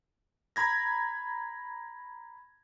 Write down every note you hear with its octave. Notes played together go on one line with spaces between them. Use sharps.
A#5 B5 G#6 A#6